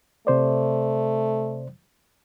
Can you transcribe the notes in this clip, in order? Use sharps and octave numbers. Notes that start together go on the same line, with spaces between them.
C3 A3 C5 D5